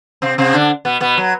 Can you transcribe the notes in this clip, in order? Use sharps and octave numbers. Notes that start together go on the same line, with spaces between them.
C3 C4
C3 C4
D3 D4
B2 B3
B2 B3
F#3